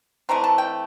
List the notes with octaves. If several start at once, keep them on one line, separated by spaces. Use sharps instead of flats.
E3 A3 C4 A#5
A5
G5